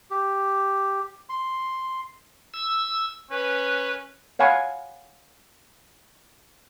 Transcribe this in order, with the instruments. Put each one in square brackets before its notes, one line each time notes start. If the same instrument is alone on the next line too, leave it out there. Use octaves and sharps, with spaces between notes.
[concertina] G4
C6
[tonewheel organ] E6
[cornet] C#4 [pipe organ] B4
[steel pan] C#5 F5 F#5 G#5 B5 C#6